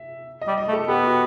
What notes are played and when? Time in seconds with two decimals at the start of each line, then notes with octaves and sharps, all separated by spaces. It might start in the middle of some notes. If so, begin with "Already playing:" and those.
Already playing: E5
0.41 D#5
0.47 G3
0.58 D#5
0.68 A3
0.73 A4
0.88 B3 G4
1.03 F#4